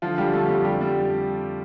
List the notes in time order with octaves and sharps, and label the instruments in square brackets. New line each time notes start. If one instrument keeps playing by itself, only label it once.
[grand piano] D3 F3 F4
D3 G3 G4
D3 A3 A4
F2 G3 G4
D3 G3 G4
F2 G3